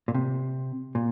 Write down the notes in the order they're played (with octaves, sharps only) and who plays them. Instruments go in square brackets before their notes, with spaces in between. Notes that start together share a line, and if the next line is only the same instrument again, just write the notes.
[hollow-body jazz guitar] A#2
C3
A#2